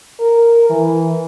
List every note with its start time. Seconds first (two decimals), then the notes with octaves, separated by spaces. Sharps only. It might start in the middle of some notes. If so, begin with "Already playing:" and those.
0.20 A#4
0.70 E3